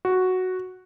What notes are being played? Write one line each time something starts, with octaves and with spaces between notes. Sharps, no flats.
F#4